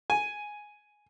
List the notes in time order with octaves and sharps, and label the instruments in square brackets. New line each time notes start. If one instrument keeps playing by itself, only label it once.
[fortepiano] G#5